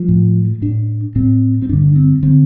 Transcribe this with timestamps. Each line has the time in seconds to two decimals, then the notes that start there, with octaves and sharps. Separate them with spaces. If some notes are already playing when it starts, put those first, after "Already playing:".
Already playing: F3
0.08 A2
0.62 A2 D4
1.15 A2 C4
1.62 C4
1.69 G2 D3 D4
1.96 C4
2.23 D3 C4